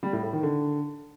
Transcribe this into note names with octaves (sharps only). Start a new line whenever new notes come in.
G3
A2
A2
D#3
D3